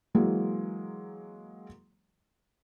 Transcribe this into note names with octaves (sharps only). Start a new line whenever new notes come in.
E3 F#3 G#3 A#3